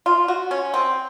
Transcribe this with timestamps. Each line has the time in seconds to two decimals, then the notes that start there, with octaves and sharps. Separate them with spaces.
0.06 F4
0.28 F#4
0.51 C#4
0.74 C4